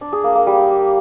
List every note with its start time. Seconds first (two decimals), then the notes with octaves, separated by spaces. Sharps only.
0.01 D4
0.13 G#4
0.24 A#3
0.35 A#3
0.47 G3